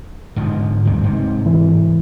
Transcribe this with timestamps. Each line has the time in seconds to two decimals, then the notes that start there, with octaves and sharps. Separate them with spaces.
0.36 G#2 D3 F3
0.86 D2 G2 C3
1.04 G#2 C3
1.46 E3